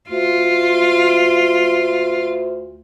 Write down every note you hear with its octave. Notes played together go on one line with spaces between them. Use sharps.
D2 F4